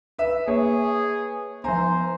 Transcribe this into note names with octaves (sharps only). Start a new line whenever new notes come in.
B4 E5
A#3 G#4 B4 C#5
F3 B3 C5 G#5 A#5